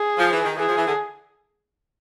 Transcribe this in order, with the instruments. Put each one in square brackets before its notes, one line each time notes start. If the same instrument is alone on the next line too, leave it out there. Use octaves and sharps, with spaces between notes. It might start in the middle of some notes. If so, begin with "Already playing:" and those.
Already playing: [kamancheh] G#4
[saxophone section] F3
E3
D#3
[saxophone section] E3 [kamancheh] G#4
[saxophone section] F3
E3
D3